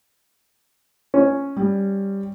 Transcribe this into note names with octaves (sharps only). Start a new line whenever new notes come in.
C#4
G3